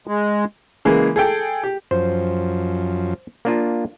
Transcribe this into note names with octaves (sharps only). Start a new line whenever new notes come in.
G#3
C#3 E3 G#3 A#3 G#4
G#4 A4 G5
G4
F#2 F3 C5
A#3 D4 F4